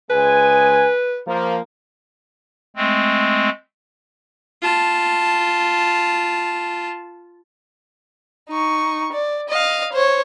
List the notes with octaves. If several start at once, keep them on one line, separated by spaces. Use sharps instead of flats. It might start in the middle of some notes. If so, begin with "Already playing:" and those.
C#2 G#3 B4 G#5
F3 A#3
G#3 A3 C4
F4 A5
D#4 C#6
D5
D#5 F5
C5 C#5